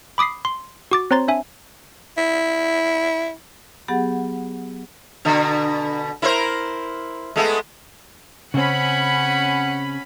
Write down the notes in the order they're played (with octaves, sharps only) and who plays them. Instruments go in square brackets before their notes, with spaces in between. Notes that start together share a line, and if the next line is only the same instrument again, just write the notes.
[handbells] B5 D6 D#6 B6 C7
C6
F#4 D6 A6
C4 C5 C#5 A#5 C6 A6
D4 E5 G#5
[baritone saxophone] E4
[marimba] F#3 B3 G4 G#4 F#5 A6
[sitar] B2 D3
E4 A#4 C5
G#3 A3 B3
[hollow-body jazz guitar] C#3 C4 [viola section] C#4 B5 [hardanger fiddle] F#5